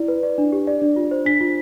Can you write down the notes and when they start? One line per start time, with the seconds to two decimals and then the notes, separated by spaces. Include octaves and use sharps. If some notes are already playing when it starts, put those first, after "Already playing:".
Already playing: E4 D5
0.08 B4
0.23 D5
0.38 D4
0.52 G4
0.67 D5
0.82 D4
0.96 F4
1.11 C5
1.25 D4 B6
1.40 F4